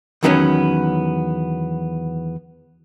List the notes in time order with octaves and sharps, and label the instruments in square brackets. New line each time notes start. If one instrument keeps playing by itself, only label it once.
[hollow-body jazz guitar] E2 D#3 F#3 A3 B3 C#4